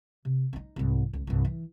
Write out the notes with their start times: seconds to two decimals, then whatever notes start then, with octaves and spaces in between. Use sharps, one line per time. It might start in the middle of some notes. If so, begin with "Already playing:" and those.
0.25 C3
0.53 D4 D#4
0.76 C2 G#2
1.13 C#2
1.27 C2 G2
1.45 E3